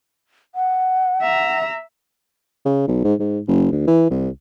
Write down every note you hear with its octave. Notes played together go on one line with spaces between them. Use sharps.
F#5
E5 A#5
C#3
B1
G#2
G#2
F#1
D2
E3
C2